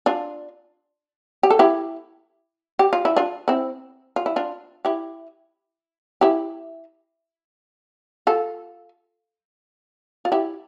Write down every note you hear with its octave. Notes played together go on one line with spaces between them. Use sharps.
D4 F4
G4
A4
E4 G4
G4
F4
E4
D4 F4
C4 E4
F4
E4
D4 F4
E4 G4
E4 G4
F4 A4
F4
E4 G4